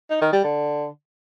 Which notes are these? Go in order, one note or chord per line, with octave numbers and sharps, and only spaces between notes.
D#4
D#3
G3
D3